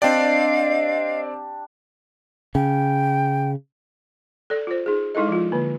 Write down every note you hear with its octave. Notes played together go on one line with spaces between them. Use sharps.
C4 D4 G4 D5 D#5 F5
C#3 G5
A4 D5
F4 C5
D#4 G#4
G#3 D#4 E4 A4 D#5
F3 F4
D3 A#3